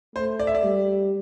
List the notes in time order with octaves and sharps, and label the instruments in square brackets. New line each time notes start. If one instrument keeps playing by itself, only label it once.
[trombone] A3 [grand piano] C5
[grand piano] D5
E5
D5
[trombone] G3